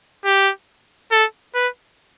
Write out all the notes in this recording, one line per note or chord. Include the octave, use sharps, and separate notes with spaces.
G4
A4
B4